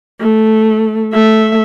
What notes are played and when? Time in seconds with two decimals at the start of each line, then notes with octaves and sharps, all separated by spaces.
0.21 A3
1.13 A3 E5